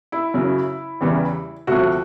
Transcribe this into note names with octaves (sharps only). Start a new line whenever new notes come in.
E4
F#2 C#3 F#3
E2 C#3 E3 G3
D2 C3 F3 F#4